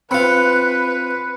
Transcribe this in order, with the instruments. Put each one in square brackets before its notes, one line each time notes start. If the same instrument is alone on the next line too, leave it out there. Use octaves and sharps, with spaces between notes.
[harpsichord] C4 F4 [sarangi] B4 [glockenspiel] B5 F#6 C#7